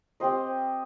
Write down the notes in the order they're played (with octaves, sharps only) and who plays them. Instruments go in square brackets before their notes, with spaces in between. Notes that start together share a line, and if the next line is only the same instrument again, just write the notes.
[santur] C4 G4 C5 D#5